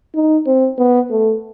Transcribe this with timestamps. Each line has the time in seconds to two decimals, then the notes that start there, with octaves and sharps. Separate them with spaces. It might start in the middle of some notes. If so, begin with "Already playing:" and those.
0.15 D#4
0.46 C4
0.78 B3
1.11 A3